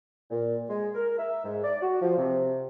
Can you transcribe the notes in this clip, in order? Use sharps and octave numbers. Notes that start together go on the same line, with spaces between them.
A#2
G#3
A#4
E5
G#2
D5
F#4
F3
C3